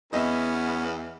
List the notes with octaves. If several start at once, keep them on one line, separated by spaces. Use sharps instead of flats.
E2 B3 C#4 E4 D#5 E5